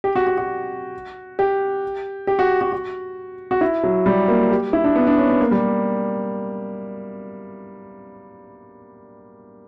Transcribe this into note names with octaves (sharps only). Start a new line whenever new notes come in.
G4
F#4
F#4
F#4
G4
G4
F#4
F#4
F#4
F#4
E4
F#3
G3
A#3
G4
E4
D4
B3
D4
C#4
B3
A#3
G3